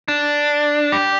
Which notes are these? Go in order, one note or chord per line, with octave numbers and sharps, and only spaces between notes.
D4
G4